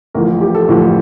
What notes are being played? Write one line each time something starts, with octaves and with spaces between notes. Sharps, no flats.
A1 A2 F3 A#4
G4
A4
A1 A2 F3